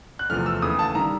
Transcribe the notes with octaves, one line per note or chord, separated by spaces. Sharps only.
F#6
E2 C3 F3 A3 F6
E6
D#2 C#3 E3 A3 D#6
A5
D#3 G3 A#5